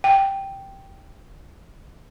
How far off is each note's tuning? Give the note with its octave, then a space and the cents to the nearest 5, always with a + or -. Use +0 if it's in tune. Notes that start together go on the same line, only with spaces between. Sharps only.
G5 -5